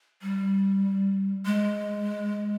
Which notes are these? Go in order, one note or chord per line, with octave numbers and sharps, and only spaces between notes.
G3
G#3